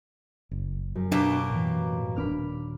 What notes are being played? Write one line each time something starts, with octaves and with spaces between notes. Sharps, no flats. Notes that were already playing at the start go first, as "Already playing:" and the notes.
F#1
F#2
B2 A#3 D4 G4
A2 E3
D#1 C#4 D4 B5 D6 F6